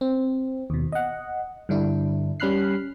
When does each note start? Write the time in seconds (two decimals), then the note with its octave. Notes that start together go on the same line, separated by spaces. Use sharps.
0.01 C4
0.70 D#2 B2
0.92 D#5 F#5
1.69 G2 D3 D4 E4
2.40 G3 C#4 B5 F6 F#6 C7